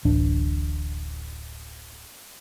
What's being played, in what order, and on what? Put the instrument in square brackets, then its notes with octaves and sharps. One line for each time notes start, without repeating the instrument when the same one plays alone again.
[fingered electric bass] D1 A1 D4